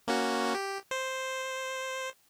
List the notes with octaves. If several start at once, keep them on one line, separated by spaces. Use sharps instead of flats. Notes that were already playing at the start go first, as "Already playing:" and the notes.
A#3 C#4 F#4
G4
C5